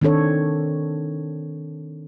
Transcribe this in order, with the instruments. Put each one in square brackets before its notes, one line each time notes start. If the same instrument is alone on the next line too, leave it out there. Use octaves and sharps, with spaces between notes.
[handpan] D#3 C4 D4 A4 C#5